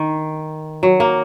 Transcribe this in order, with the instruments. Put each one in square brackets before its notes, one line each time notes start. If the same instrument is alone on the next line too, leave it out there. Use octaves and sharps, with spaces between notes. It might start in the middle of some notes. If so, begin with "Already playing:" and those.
Already playing: [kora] D#3
F#3
A#3